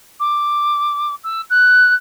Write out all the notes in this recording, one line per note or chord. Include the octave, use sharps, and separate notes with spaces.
D6
E6
F#6